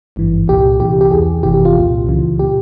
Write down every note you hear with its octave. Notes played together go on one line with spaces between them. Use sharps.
G#1 G2 E3
C2 A#2 G4
C2 C3 E3 G4
G4
E2 E3 G#4
G1 F2 C3 E3 G4
G4
F4
C2 A#2
C#2 C#3 E3
A#2 G4